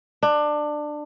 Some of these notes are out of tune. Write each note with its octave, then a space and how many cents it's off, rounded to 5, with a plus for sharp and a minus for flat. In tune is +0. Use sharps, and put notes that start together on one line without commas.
D4 +20